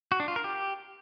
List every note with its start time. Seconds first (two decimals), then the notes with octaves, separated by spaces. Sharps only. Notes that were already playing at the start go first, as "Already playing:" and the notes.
0.12 F#4
0.20 D4
0.28 F4
0.36 A#4
0.44 G4